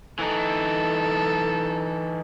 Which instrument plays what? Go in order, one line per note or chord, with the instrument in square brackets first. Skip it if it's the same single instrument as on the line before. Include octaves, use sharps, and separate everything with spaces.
[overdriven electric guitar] E3 D#4 [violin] A4